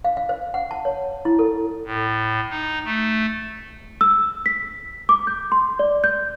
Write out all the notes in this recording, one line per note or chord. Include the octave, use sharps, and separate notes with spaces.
F5
F5
C5
F#5
A5
C#5
E4
A4
A2
D#4
A3
E6
B6
D6
G6
C6
D5
G6